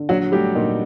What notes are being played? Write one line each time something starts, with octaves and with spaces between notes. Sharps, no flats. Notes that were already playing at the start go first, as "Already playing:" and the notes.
Already playing: D3
A#1 F#3 F#4
G3 A3 G4
A#2 D#4